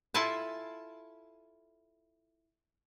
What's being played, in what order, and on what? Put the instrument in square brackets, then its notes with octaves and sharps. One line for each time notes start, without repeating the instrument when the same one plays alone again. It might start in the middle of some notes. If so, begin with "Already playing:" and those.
[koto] E4 F4 A4 E5 G#5 A5